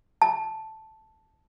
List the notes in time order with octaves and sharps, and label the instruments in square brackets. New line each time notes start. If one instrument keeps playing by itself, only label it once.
[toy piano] A5